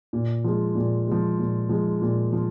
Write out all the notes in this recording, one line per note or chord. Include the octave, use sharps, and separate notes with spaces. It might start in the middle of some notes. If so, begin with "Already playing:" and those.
A#2
F3 G#3
A#2
F3 G#3
A#2
F3 G#3
A#2
F3